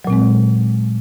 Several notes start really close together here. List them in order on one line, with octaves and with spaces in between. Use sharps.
F#3 A#2 C4 G#3